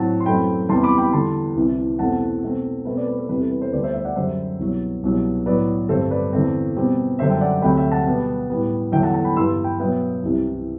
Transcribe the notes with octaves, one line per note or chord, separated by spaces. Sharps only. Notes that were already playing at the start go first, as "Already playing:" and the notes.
Already playing: A2 F#3 C4 F#5 A5
C6
F#2 E3 A3 C4 G5 B5
E2 C3 G3 B3 A5 C6
B5 D6
G5 B5
E2 D3 G3 A5 C6
C2 C3 E3
E2 B2 A3 C4 F#5 A5
B2 A3 C4
B2 A3 C4 B4
B4 D5
B4
A4
E2 C3 G3 C4 B4
A4
B4
A4 C5
D2 D3 G3 B3 B4 D5
C5 E5
C5 E5
D5 F#5
F#2 D3 G3 C5 E5
C2 B2 F#3
C2 B2 F#3
A2 F#3 B3 B4 D5
G2 D3 A3 C4 A4 C5
B4 D5
E2 D3 A3 C4
B2 G3 C4
F#2 D3 G3 C5 E5
E5 G5
D5 F#5
D2 C3 F#3 A3 G5 B5
E5 G5
F#5 A5
B2 G3 B3
A2 G3 B3
E2 D3 F#3 A3 E5 G5
F#5 A5
F#5 A5
G5 B5
G2 E3 B3 C6 E6
G5 B5
B2 F#3 B3 E5 G5
C2 C3 E3